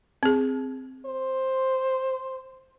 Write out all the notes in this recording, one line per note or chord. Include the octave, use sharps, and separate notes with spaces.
C4 G#4
C5